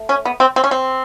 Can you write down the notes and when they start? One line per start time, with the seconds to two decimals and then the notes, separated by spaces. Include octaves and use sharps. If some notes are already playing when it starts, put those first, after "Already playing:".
Already playing: A3
0.09 C#4
0.25 B3
0.40 C4
0.56 C4
0.64 C#4
0.71 C4